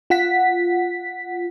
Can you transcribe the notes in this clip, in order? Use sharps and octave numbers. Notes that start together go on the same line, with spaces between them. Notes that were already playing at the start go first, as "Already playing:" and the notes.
F4 F#5 B6